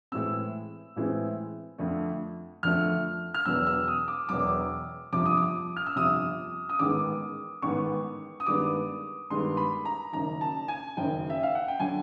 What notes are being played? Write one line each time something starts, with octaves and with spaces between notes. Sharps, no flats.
A2 E3 G#3 C4 E6
A2 E3 G#3 C4
F2 D3 F3 A3
F2 D3 F3 A3 F6
F6
E1 E2 B2 F#3 B3 E6
E6
D#6
D6
E1 E2 B2 F#3 B3 D6
G1 F2 C3 F3 D6
D#6
D6
F6
E6
G1 F2 C3 F3 D#6
D#6
A1 G#2 D#3 G#3 B3 D6
A1 G#2 D#3 G#3 B3 C#6
D#6
G2 D#3 G#3 B3 D4 D6
G2 D#3 G#3 B3 D4 C6
B5
A#5
F#1 F#2 D#3 A#5
A5
G#5
F#1 F#2 D#3 G5
E5
F5
F#5
G5
D3 F#3 G#5